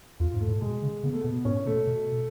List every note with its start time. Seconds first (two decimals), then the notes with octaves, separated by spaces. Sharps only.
0.20 F2 F4
0.34 G#2
0.40 A3
0.47 A2
0.61 B2 G#3
0.82 C#3
1.03 C#3 B3
1.13 A3
1.21 B2 B3
1.45 A2 C#4
1.66 B2 A3
1.87 B2